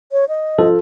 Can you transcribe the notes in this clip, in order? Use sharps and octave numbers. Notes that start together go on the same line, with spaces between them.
C#5
D#5
F3 A4